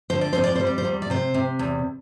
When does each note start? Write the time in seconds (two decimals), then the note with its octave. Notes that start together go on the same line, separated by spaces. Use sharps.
0.10 D3 C5
0.21 D5
0.33 F2 C5
0.44 D5
0.55 G3 C5
0.67 D5
0.78 C5
0.85 E2
1.02 D5
1.10 C3 C5
1.34 C3
1.59 E2